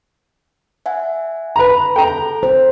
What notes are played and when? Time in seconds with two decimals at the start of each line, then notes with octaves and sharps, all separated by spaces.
0.86 E5 F#5 G#5
1.56 B4 A#5 B5
1.96 A4 G5 A#5
2.43 C5